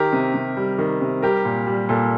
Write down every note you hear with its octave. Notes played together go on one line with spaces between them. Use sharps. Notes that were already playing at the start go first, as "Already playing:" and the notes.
Already playing: D#3 G4 A#4
C3
C3
G3
D#3
C3
G3 G4 A#4
A#2
G3
A#2 A4